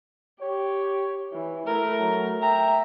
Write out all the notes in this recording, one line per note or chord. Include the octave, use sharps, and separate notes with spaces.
G4 C#5
E3
A3 E4 A#4
F#3
E5 G5 A#5